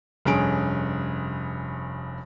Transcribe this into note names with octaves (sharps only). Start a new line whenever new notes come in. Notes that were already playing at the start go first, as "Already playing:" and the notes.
F1 G2 C#4 G#4 D7